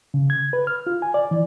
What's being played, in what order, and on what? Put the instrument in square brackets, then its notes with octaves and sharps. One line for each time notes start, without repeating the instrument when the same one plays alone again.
[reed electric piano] C#3
G#6
B4
F6
F4
G#5
D5
E3